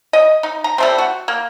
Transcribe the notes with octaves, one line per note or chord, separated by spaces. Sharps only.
D#5
D#4
A#5
G3 A3 C4
F#4
A#3